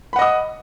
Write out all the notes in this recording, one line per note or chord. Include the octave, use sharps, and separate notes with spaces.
D#5 F#5 B5 D#6